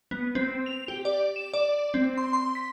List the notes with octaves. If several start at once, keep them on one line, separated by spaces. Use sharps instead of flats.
B3
C4
F7
G4
D5
E7
D5
C4
C6
C6
B6